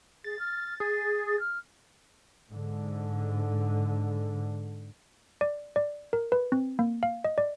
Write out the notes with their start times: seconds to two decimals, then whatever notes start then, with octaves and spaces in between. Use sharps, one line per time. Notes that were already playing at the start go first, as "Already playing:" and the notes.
0.24 G#4 A6
0.39 F6
0.80 G#4 A6
1.27 A6
1.40 F6
2.50 G#2 D3
5.41 D5
5.76 D5
6.13 A#4
6.32 B4
6.52 C4
6.79 A#3
7.03 F5
7.25 D#5
7.38 D5